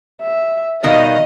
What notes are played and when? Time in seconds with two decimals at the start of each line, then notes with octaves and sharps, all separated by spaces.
0.22 E5
0.83 B2 D#3 G3 D#5 F5